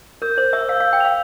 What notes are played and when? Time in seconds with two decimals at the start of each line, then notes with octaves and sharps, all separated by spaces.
0.22 A#4 G6
0.37 C5 G6
0.53 E5 E6
0.69 F5 E6
0.80 F5
0.84 E6
0.93 G5
1.00 F5 F7